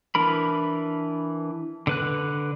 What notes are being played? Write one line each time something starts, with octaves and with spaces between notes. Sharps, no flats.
E3 D4 A#4 B5
D3 B4 F#6